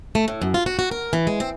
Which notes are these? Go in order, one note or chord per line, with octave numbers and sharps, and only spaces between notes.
A3
A2
F#2
F4
F#4
F#4
A#4
E3
G#3
C4